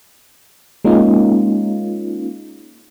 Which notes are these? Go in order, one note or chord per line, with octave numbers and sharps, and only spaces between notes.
G#3 A#3 C#4 D#4 F4